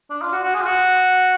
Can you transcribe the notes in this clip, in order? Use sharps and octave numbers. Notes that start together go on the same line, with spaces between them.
D4
F4
F#4
F#4
G#4
F4
F#4